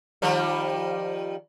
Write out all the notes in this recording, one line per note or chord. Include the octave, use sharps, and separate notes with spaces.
D#3 F3 G3